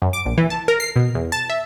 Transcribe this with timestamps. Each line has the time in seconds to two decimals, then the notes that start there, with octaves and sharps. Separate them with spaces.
0.02 F#2
0.13 D6
0.26 A#1
0.38 E3
0.50 A5
0.68 A#4
0.80 C7
0.96 B2
1.15 E2
1.32 A5
1.49 E5